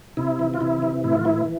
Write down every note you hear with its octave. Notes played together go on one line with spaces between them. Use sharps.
C3 E4
E3
F4
C3 E4
E3
A2 E4
F4
E3 E4